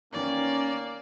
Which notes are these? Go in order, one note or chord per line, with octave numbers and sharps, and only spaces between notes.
D#3 A#3 B3 C#4 C#5 D5